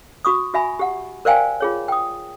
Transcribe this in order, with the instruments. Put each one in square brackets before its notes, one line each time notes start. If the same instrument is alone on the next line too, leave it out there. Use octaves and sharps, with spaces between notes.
[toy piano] F#4 C#6 D#6
F#4 E5 G#5 B5
G4 F#5
A#4 C5 D5 F5 G5 G#5
F4 G#4 C#5
G5 D#6